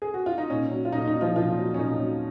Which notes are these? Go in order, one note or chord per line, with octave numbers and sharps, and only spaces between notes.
G#4
F#4
F4
D#4
A#2 C#4
F#3
F4
A#2 D#4
D#4
F#3
F3 F4
A#2 F3 F4
F#3
C#4
A#2 D#4
F#3